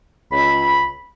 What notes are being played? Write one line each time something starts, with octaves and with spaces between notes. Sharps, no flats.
C#2 B5